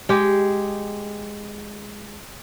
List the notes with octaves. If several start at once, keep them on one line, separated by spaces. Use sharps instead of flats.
G#3 G4